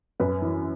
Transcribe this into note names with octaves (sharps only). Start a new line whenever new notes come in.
F#2 B4
E3